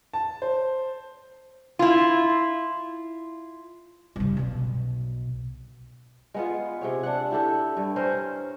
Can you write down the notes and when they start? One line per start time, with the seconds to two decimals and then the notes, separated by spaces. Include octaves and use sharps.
0.14 A5
0.42 C5
1.79 E4 F4
4.16 G2 C#3
4.37 B1 B2
6.34 G#3 B3 F4
6.81 C3 G#4 C#5
7.03 D4 F#5
7.31 E4 G4 A4
7.77 G2
7.96 C#4 A#4 C5